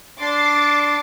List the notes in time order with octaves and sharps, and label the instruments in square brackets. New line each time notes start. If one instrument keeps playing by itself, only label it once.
[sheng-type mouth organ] D4 C6 [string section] D6 A6 C7